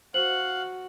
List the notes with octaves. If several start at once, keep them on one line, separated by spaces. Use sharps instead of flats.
F#4 C5 F5 F#5 F#7